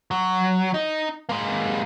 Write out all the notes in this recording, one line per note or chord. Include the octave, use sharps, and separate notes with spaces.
F#3
D#4
G#3 A#3